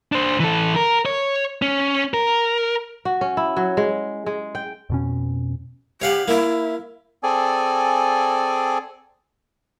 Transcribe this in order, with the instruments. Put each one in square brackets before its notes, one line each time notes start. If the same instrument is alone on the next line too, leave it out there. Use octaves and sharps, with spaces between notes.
[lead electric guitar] D4 C5
E3 A4
A#4
C#5
C#4
A#4
[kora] F#4
C#4
E4
F#3
G#3
G#3
G5
[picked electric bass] F2 B2 C#4
[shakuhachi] G4 [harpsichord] C#5 F5 F#5
[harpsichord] A#3 [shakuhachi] E4
[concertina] C4 G#4 A4 D5 G#5